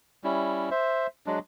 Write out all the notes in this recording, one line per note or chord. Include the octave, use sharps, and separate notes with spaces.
G3 C#4 E4
C5 E5
F#3 G#3 D4